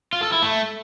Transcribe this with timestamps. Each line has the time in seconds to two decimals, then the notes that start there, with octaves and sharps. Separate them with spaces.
0.13 F4
0.23 A4
0.33 E4
0.43 A3